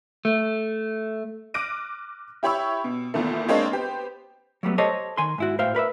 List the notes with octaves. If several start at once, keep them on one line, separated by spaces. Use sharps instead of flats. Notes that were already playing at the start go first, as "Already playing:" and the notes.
A3
D6 F6 F#6 A#6 D7 D#7
E4 G4 C#5 B5 C#6 E6
B2
E2 A#2 D#3 A3
G#3 A#3 C4 D4 C#5 D#5
B3 G4 C5
F#3 G3 A3 B3
G4 A4 C5 C#5 D#5 A5
D#3 G#5 C6
G#2 E4 F#4
A2 C5 E5 F5 G5
A#4 B4 D5 E5